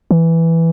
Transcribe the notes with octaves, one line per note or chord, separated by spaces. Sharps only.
E3